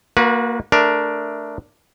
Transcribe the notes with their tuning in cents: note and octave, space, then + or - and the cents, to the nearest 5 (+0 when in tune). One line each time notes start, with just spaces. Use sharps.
A#3 +0 F#4 -25 B4 -35
A3 +0 D4 +0 A#4 +15